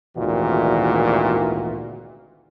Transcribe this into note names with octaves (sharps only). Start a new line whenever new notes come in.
G#1 D2 A#2 D#3 E3 F#4